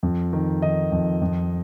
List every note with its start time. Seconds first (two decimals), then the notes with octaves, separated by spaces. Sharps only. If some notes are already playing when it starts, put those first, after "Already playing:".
0.03 F2
0.33 D#3
0.62 D#3 D#5
0.92 F2
1.22 F2